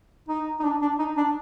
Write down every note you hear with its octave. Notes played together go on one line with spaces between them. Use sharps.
D#4
D#4
D4
D4
D#4
D4